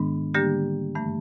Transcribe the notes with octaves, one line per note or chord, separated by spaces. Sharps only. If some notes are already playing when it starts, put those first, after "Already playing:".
Already playing: G#2 D#3 G#3 B3 D4
D3 G3 A#3 D4 G4
G2 E3 A3